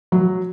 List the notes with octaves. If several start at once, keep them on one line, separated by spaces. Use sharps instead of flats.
F#3